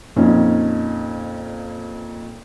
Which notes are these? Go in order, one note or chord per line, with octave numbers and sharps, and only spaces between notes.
F2 A#2 C#4 D#4